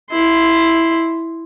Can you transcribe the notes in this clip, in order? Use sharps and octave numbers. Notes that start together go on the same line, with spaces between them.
E4 C6